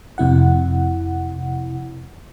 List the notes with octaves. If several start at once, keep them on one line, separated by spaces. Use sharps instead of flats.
F2 C3 E4 F#5